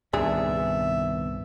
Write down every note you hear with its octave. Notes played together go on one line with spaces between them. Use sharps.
C2 G2 A#2 D#3 B3 D4 G#4 E5